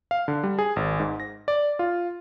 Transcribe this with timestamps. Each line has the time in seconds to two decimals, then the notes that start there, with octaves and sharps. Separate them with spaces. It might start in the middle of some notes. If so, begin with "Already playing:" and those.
0.11 F5
0.28 D3
0.43 G3
0.59 G#4
0.76 G#1
1.00 G#2
1.20 A#6
1.48 D5
1.79 F4